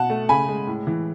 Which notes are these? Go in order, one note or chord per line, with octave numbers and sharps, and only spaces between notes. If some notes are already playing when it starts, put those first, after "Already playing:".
Already playing: B2 F#5 A5
A3
C#3 G#5 B5
G#3
A2
E3